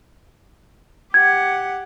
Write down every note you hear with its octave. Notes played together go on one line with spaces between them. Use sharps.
G4 F#5 G#6